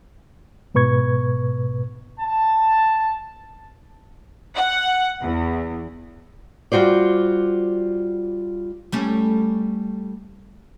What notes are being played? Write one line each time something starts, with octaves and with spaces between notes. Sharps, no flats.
G#2 B2 B4 C#6 G#6
A5
F#5
E2
G3 F4 F#4 C5 D5
G3 A3 C#4